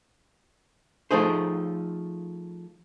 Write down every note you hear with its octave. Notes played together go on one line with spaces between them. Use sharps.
F3 A3 D#4 G#4 C5